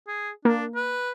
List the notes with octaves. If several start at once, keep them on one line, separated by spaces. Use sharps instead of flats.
G#4
A#3 D4
B4